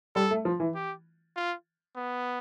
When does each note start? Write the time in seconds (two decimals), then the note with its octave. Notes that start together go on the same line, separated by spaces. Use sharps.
0.15 G3 A4
0.31 A3
0.45 F3
0.60 E3
0.75 G4
1.36 F4
1.96 B3